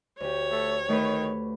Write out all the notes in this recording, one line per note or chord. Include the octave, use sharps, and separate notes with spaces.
D2 G4 C#5
A3
D#3 A3 B4